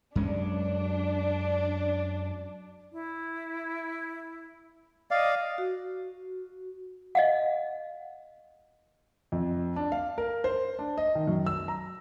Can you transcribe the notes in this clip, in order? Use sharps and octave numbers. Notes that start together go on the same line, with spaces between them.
F#2 G#3 C#4 D4
E4
D5 D#5 F5
F#4
D#5 F5 F#5
F2
D4
F5
A#4
C5
D4
D#5
D#3
F#2
E6
A#5